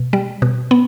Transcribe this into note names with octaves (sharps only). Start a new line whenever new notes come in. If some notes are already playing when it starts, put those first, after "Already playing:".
Already playing: B2
G3
B2
B3